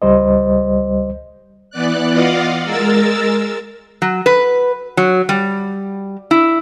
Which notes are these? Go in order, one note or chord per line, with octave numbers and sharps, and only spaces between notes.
C#2 G3 C5 D#5
E3 B3 D5 F#6
F4 D5 D#5 F5 F#5
G#3 A#4 E6 A6
F#3
B4
F#3
G3
E4